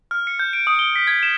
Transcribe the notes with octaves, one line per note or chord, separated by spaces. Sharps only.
F6
C#7
G6
D7
D#6
G7
B6
G#6
E7